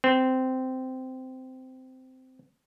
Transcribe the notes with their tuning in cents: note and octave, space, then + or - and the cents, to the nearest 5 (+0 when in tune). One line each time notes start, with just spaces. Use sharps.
C4 -15